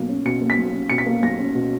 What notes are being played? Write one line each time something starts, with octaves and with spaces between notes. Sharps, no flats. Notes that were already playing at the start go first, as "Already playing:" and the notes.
Already playing: B1 A#3
C#4
B2 C#7
A#3
B6
B1
C#4
B2 C#7
B6
A#3
B1 A#6
C#4
B2